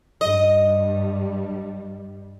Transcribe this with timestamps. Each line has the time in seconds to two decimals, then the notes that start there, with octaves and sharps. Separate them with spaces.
0.21 G2 G3 D#5